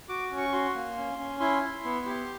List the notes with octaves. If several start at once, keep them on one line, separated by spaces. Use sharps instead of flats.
F#4 D6
C#4
C#6
F#4 C6
A#3
C#4
C#4
E4 C6
E4
B3
G4